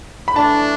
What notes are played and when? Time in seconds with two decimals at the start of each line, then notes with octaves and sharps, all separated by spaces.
0.28 B5
0.36 E3 A3 D4 A5